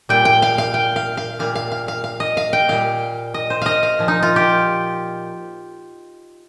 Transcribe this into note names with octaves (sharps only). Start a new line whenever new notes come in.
A#2 G3 G5
G5
F5
F5
G5
F5
F5
A#2 G3 F5
F5
F5
F5
F5
D#5
F5
G5
A#2 G3 F5
D#5
C5
D#5 F5
F5
A#2 F3
D#4
F4
G4